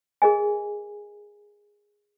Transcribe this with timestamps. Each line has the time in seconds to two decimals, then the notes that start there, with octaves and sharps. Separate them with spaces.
0.22 G#4 A#4 D#5 G#5